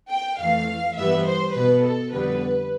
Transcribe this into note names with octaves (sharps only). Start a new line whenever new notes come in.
G5
F2 E3 A3 F5
G2 E3 G3 B3 E5
C5
B2 B3 B4
A4
F2 D3 G3 B3 B4